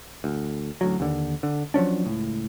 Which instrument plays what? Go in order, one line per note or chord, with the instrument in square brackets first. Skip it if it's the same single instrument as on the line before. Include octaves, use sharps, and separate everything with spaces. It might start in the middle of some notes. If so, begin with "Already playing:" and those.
[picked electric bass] D2
A1 D2 F#3
D#2 D3
D3
F3 F#3 C#4 D4
C#2 A2